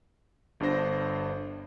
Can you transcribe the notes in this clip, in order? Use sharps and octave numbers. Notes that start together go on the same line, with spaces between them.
G1 G2 D4 C5 A#6